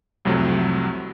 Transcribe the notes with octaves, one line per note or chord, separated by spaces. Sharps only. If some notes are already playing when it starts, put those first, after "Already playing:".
C2 F2 C3 F#3 A3